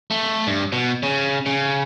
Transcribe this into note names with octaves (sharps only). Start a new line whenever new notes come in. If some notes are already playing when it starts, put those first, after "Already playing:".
A3
G2
B2
C#3
C#3